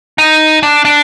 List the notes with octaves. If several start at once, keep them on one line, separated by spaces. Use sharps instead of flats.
D#4
D4
D4